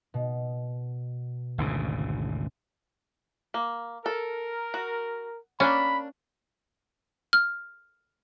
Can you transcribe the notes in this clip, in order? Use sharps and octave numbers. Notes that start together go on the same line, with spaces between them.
B2
G#1 D2 C#3
A#3
A4 A#4
F#4
A#3 C#4 D4 G#5 B5
F6